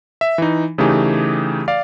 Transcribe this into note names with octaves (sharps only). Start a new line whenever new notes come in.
E5
E3 D#4
C#3 E3 A3 D#4 G4 G#4
D5 F5